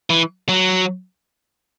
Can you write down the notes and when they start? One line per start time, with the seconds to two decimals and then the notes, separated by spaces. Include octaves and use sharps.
0.10 E3
0.49 F#3